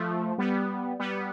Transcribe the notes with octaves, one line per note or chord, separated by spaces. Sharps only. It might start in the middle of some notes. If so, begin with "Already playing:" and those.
Already playing: F3 A3
G3 B3
G3 B3